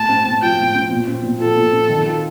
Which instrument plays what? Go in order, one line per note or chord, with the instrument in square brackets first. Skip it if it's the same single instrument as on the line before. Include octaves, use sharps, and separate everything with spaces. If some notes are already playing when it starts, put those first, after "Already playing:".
Already playing: [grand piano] A2 [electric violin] A5
[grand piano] C4
A2
[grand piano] F3 [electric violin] G5
[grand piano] A2
C4
A#2
C4
A#2
[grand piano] F3 [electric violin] A4
[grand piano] A#2
C4
D#3
F4